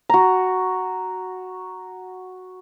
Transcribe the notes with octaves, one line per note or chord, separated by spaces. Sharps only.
F#4 A#5